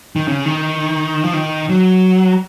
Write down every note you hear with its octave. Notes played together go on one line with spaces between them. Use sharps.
D#3
C#3
D#3
F3
D#3
F#3